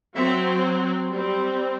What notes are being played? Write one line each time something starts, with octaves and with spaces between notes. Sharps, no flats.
F#3 C4 E5
G3
C4